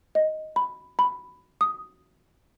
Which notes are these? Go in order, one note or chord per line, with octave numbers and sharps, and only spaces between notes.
D#5
B5
B5
D#6